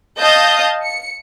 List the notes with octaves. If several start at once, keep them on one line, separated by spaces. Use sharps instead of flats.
D#5 F5 A5 D#6 G6
C#7